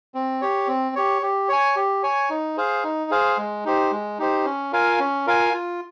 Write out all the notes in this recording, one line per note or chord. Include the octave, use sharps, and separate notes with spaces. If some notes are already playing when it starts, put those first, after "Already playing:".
C4
G4 C#5
C4
G4 C#5
G4
C#5 G#5
G4
C#5 G#5
D#4
G#4 C5 F5
D#4
G#4 C5 F5
G#3
D#4 G4 C5
G#3
D#4 G4 C5
C#4
F4 A#4 F5 G#5
C#4
F4 A#4 F5 G#5
F4